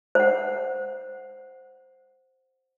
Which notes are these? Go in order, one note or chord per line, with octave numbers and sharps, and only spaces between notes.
C5 F#5